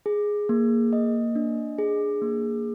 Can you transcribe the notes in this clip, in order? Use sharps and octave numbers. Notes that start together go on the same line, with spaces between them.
G#4
A#3
D#5
D4
G#4
A#3